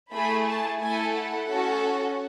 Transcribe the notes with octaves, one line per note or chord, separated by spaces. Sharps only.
A3 E4 G#4 B5
A5
A3 E4 A4 G#5
F#5
C#4 F#4 A4